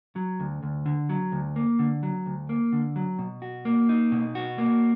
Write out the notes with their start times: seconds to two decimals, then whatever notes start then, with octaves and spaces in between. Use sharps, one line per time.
0.16 F#3
0.40 D2
0.63 D2
0.86 D3
1.09 F#3
1.32 D2
1.56 A#3
1.79 D3
2.03 F#3
2.26 D2
2.49 A#3
2.73 D3
2.96 F#3
3.19 B2
3.42 F#4
3.65 A#3
3.89 D#4
4.12 B2
4.35 F#4
4.58 A#3